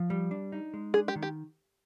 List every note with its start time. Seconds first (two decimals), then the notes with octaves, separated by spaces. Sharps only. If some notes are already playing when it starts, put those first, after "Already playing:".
Already playing: F3
0.10 G3
0.31 D4
0.52 D#4
0.74 G#3
0.94 D4 G#4
1.08 G4
1.16 D#3
1.23 G4